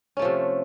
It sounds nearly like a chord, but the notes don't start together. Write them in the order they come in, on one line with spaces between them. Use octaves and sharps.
C#4 A3 F3 C3